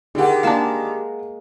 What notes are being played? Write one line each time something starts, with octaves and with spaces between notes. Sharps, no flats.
D3 D#3 G4 G#4 F#5
G#3 A#3 D4 F5 A5